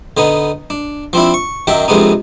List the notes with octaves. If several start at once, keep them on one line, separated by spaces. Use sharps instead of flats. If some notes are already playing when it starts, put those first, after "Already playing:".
D3 B3 D#4
D4
F3 C4 D4 E4
C#6
F#2 D#3 F#3 E5 G5
F2 C3 G#3 B3 D4 D#4